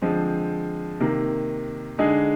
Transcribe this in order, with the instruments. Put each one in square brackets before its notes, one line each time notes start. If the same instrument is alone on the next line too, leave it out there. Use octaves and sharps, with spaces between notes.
[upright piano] D3 F3 G#3 C4
C3 D#3 A#3
D3 G#3 D#4 G#4